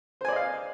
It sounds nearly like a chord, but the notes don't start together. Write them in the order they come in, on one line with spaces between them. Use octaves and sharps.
C5 G#5 D5 D#5 F5